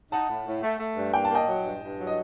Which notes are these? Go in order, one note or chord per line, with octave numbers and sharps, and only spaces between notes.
D#4 F#5 A5
A2
A2
A3
A3
G2
A#3 G5
A5
A#3 D#5 G5
F#3
G2
G2
F#3
D#5